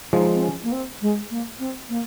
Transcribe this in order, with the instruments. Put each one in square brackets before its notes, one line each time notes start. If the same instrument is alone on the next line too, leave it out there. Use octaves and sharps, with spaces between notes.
[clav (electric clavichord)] F3 G#3 [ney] D#4
[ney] C4
C#4
A#3
C4
G#3
A#3
C4
A#3